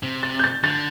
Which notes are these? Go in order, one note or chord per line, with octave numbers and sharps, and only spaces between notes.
C3
A6
G6
A6
D3 A6